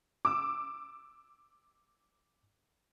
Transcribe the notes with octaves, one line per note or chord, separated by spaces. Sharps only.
D6 E6